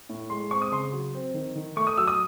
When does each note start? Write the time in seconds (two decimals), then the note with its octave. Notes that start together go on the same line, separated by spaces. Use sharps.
0.09 A2
0.30 G#3 C6
0.51 C4 C#6
0.62 D#6
0.71 C#3 C6
0.93 F#3
1.14 C4
1.34 D#3
1.56 D#3
1.76 A3 C#6
1.87 D#6
1.97 F#3 E6
2.08 D#6